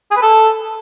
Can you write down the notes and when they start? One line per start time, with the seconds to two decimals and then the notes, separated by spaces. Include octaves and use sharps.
0.11 G#4
0.16 B4
0.22 A4